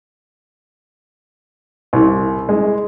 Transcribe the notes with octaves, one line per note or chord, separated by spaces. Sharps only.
C2
G#3